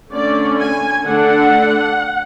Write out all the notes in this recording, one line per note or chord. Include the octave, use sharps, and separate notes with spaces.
D3 A3 C#4 D5
G#5
D3 A3 D4 F#5